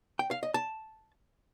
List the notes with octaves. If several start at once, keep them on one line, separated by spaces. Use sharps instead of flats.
G5
F5
D#5
A5